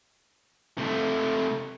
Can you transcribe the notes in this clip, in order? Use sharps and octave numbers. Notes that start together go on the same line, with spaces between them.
C3 A3